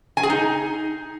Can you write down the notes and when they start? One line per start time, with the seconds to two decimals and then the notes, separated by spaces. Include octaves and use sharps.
0.17 G#5
0.23 G#4
0.30 D#4